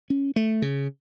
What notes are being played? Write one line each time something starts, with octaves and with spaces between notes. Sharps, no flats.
C#4
A3
C#3